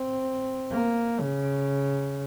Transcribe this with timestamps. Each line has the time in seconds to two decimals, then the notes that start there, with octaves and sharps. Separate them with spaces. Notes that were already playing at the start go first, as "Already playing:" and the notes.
Already playing: C4
0.71 A#3
1.20 C#3